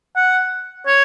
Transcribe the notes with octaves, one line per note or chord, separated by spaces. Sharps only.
F#5
C#5